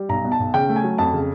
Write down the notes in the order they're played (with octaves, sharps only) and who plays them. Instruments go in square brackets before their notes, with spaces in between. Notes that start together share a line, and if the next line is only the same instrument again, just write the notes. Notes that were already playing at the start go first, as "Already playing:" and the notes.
Already playing: [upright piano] G3
B1 A#5
B2
A5
B1
C#3 G5
A3
G#5
F#3
F2 A5
C#3